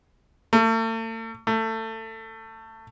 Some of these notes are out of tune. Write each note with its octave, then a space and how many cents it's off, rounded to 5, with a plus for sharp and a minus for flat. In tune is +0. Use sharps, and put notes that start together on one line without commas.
A3 +40
A3 +25